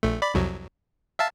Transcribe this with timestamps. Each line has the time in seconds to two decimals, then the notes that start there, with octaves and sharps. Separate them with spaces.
0.03 A#1 A3
0.22 D5 B5
0.34 C2 F2 F#3
1.19 E5 F5 A5